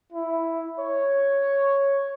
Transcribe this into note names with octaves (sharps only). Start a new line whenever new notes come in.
E4
C#5